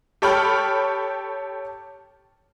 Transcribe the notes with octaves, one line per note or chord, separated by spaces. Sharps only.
G4 A4 C#5 G5 B5 F6